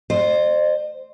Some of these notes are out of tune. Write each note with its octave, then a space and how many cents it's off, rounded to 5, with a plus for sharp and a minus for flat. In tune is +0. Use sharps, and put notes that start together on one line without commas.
C5 +0 D#5 -45